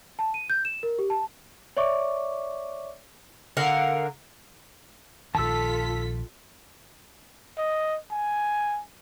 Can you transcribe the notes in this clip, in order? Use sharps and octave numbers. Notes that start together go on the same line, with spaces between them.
A5
D#7
G6
E7
A#4
G4
A5
C#5 D5 E5 C#6 D6
D3 A#4 F5 F#5
A#1 D#3 F4 A4 A5 E6 B6
D#5
G#5